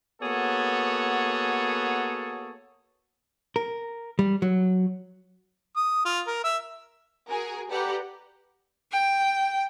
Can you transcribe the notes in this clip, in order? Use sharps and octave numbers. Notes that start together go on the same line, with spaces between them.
A#3 B3 F#4 G#4 A4 C#5
A#4
G3
F#3
D#6
F4
A#4
E5
F#4 G#4 A#4 G#5
G4 A4 B4 D5 F#5 A#5
G5